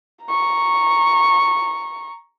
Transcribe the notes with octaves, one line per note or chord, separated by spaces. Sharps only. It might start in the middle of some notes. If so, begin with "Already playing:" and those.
A#5 C#6